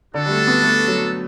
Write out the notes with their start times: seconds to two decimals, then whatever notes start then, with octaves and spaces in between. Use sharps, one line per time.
0.14 D3 D4 F#4 A4
0.26 G3
0.30 A3
0.47 B3
0.63 A3
0.88 F#3